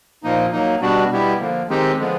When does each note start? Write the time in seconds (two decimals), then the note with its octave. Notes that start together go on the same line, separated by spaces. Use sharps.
0.23 A#2 F3 A#3 D#4
0.52 F#3 A#3 D#4
0.81 B2 G3 B3 D4 F#4
1.10 B2 G3 B3 E4 G4
1.40 D3 F3 A#3
1.68 D#3 G#3 C4 D#4 G4
1.98 D3 F3 G#3 B3